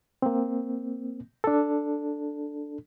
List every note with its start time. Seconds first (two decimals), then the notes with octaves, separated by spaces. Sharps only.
0.22 A#3 C4
1.44 D4 A4